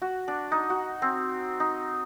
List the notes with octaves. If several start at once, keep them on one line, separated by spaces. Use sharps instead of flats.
F#4
D4
D#4
F#4
C4
D#4